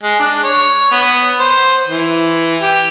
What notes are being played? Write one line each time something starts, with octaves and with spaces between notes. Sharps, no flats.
G#3
D4
C#5
B3
C5
E3
G4